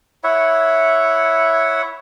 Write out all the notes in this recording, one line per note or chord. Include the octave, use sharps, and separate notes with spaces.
E4 C#5 E5 F#5